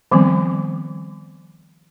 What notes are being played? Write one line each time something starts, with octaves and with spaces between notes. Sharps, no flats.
D#3 F3 G3 B3 C4